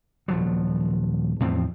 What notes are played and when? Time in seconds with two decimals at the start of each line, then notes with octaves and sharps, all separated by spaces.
0.28 D#1 F3 F#3
1.40 E2 A2 F3 C4